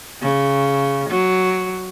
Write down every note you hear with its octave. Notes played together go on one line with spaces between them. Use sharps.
C#3
F#3